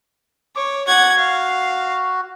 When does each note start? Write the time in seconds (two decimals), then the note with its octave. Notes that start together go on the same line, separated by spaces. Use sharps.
0.56 C#5 D6
0.87 F#4 F#5 G#6
1.18 F5